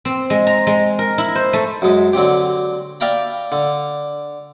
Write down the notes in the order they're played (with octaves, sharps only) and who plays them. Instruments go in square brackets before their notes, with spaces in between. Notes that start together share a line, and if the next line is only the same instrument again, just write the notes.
[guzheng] C4
G#3
A#5
G#3
A#4
E4
C5
A3
[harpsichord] F#2 G#3
D3 F#3 C4 G4
D5 E5 F5 G5 A#5 B5
D3